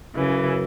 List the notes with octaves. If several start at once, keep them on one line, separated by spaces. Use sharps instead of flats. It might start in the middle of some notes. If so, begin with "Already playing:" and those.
F#2 C#3 E3